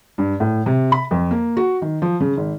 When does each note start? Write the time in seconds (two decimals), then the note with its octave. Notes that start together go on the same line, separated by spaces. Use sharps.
0.18 G2
0.40 A2
0.66 C3
0.92 B5
1.11 F2
1.31 A#3
1.57 F#4
1.82 D#3
2.02 F3
2.20 C#3
2.37 G#1